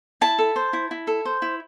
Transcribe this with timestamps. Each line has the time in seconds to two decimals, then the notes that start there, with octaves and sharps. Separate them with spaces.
0.21 E4 A5
0.39 A4
0.56 C5
0.73 E4
0.91 E4
1.07 A4
1.25 C5
1.42 E4